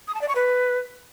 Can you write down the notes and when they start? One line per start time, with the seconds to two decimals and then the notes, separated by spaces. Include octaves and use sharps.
0.08 D#6
0.15 A5
0.22 D5
0.28 C#6
0.35 B4